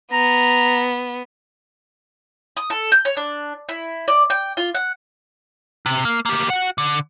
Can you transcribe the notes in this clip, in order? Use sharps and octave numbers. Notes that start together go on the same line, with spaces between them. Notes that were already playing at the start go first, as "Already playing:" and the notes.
B3 A#5
D#6
A4
G6
C#5
D4
E4
D5
G5
F4
F#5
C3
A#3
A#3 G4
F#4 F#5
D3